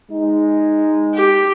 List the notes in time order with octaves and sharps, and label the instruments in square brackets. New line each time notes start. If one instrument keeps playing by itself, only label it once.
[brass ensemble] G#3 D#4
[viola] G4